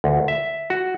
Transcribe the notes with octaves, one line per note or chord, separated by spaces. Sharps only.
D2
E5
F#4